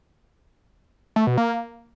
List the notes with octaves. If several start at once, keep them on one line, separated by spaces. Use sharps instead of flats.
A3
B2
A#3